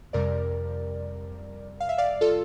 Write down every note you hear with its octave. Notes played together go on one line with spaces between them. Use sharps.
F2 C3 G3 A#4 D5
F5
E5
D5 F5
F4 A4